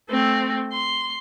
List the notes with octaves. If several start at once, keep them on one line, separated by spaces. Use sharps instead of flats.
A3 C4
C6